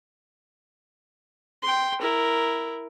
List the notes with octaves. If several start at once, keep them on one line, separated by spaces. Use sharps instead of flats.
G5 C6
E4 A#4